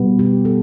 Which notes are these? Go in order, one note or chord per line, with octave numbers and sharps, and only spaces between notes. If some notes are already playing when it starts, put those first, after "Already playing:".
Already playing: B2 G3 B3
G4
A4